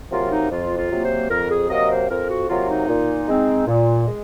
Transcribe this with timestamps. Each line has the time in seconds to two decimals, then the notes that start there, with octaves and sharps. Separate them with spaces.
0.10 C3 F#3 A#3 F4
0.30 D#4
0.50 F2 F4
0.77 F4
0.90 C3 F#3 A#3
1.04 C5
1.29 F2 A#4
1.50 G#4
1.69 C3 F#3 A#3 D#5
1.89 C5
2.09 F2 A#4
2.28 F#4
2.48 C3 F#3 A#3 F4
2.68 D#4
2.88 A#2
3.28 G#3 C4 D#4
3.67 A#2
4.08 G#3